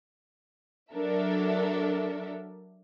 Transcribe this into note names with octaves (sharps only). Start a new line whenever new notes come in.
F#3 D4 A4 A#4 E5